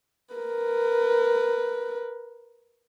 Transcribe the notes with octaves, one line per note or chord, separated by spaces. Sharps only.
A#4 B4